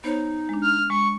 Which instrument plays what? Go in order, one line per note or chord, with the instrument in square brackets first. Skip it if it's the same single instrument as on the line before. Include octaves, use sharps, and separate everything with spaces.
[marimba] B3 C5 C#5 [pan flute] D#4
[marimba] G#3 D4
[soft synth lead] F6
[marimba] G#3 [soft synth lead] C#6